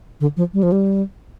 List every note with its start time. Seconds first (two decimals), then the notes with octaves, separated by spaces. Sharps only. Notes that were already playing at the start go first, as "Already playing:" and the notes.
0.20 D3
0.37 F3
0.54 G3
0.63 F3
0.72 G3